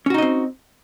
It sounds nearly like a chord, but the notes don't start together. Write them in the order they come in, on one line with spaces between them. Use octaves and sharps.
C#4 F#4 D#4 D#5 C4